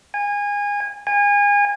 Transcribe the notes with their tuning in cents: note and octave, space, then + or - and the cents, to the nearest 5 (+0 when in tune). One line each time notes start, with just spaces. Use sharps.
G#5 -25
G#5 -30